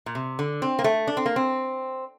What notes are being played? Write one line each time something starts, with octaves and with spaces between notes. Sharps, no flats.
A#2
C3
D3
C4
A#3
A3
D4
C4
A#3
C4